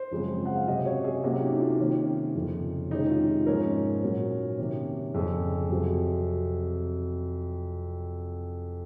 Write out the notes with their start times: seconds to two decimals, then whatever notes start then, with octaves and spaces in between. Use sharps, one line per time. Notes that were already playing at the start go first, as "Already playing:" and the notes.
Already playing: C5
0.11 F#2 C#3 F3 G#3 C4
0.45 F#5
0.56 F5
0.67 C3 F#3 C#4 D#5
0.86 C#5
1.04 G#4
1.23 C3 F#3 A#3 C#4 F#4
1.42 D#4
1.60 F4
1.79 C3 D#3 A#3 C#4
2.35 F2 C#3 F3
2.91 C3 D#3 G#3 C#4 D#4
3.10 F4
3.46 G#2 F3 A#3 C#4 A#4
4.02 A#2 F#3 C#4
4.58 C3 D#3 A#3 C#4
5.14 F2 C#3 F3 G#4
5.70 F2 C3 F#3